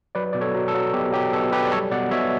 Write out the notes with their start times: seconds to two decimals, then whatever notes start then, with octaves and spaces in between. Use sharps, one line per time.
0.15 F#3 B4 D5
0.33 B2 D5
0.41 A4 C#5
0.54 F#3
0.68 A4
0.74 F#3
0.93 B2 G4
1.13 F#3 G4
1.33 B2 A4
1.52 F#3 G4 B4
1.65 D5
1.72 G3 A4 C#5
1.92 B2 D5 F#5
2.11 B2 C#5 E5